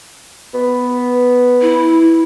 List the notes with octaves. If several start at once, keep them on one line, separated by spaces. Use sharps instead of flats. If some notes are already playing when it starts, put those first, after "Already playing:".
B3
E4